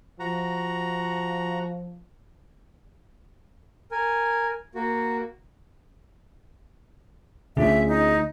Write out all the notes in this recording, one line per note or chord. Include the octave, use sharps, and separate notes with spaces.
F3 F#4 A#5
A#4 G#5
A#3 F#4
D2 C#4 D4 F4 G#4 E5
D#4